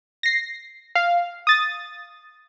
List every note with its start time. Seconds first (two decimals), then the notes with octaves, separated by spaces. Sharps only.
0.23 A#6 C7
0.95 F5
1.47 D#6 A6